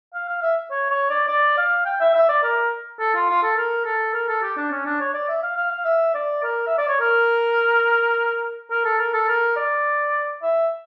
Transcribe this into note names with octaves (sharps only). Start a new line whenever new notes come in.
F5
F5
E5
C#5
C#5
D5
D5
F5
G5
E5
E5
D5
A#4
A4
F4
F4
A4
A#4
A4
A#4
A4
G4
D4
C#4
D4
C#5
D5
E5
F5
F5
F5
E5
D5
A#4
E5
D5
C#5
A#4
A#4
A4
A#4
A4
A#4
D5
E5